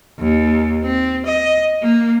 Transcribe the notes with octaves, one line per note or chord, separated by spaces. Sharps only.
D#2
C4
D#5
A#3